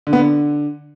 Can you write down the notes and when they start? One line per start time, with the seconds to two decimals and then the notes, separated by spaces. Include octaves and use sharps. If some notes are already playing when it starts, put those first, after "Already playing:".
0.07 D3
0.13 B3
0.19 D3